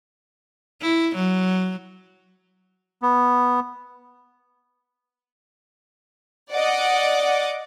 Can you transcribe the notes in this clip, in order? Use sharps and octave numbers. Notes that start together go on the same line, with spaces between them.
E4
F#3
B3
D5 D#5 F#5 D6